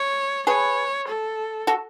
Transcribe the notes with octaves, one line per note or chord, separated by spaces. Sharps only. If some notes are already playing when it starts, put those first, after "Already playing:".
Already playing: C#5
G#4 B4 C#5
A4
F#4 A4